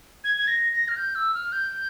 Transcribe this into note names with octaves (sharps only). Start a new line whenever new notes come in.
G#6
G#6
A#6
A#6
F6
G6
E6
F6
G6